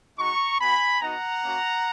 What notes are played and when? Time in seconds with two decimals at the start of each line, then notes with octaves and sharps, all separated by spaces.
0.18 G#3 D#4 F#4 A#5 C#6
0.60 B3 F#4 G#5 B5
1.01 B3 D#4 F#4 F#5 A#5
1.43 A#3 C#4 F#4